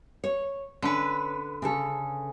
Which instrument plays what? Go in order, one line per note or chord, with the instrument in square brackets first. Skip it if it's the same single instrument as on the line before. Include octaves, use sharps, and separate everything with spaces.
[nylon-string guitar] C#5
[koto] D3 B4 [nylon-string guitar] C#4
[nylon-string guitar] C#3 C#4 A4